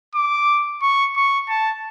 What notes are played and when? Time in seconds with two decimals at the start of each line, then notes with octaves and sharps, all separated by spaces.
0.15 D6
0.82 C#6
1.16 C#6
1.49 A5